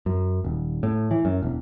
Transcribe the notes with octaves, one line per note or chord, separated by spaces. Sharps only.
F#2
D#1
A2
E3
F#2
E1